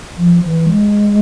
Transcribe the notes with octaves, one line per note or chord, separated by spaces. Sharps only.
F3
E3
G#3